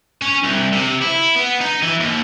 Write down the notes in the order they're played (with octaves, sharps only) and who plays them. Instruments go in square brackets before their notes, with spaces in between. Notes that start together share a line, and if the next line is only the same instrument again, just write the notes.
[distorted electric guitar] C#4
C2
C3
E4
B3
D#4
E3
D#2